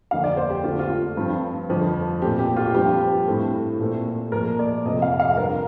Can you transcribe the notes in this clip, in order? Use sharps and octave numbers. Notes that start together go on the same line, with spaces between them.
F2 D3 F3 A#3 F5
D5
C5
G4
D3 A3 C4 F4
F4
G2 F3 C4
F2 D3 F3
A#2 A3 C4 G4
G4
F4
G2 F3 C4 G4
A2 A3 C4
A#2 A3 C4
A#2 F3 A#3 A#4
D5
F2 C3 F3 A3 C4 D#5
F5
F5
G2 F3 C4 A#4